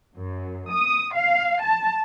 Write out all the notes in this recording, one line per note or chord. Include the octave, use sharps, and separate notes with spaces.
F#2
D#6
F5
A5